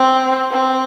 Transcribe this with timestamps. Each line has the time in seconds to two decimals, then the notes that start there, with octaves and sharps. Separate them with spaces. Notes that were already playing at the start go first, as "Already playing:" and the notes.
Already playing: C4
0.51 C4